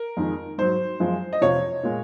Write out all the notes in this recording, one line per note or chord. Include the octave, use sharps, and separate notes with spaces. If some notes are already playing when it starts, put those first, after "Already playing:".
Already playing: A#4
F2 D#3 G#3
G#2 F#3 C5
F#2 F3 G#3
D#5
F2 C3 F3 C#5
A#2 G#3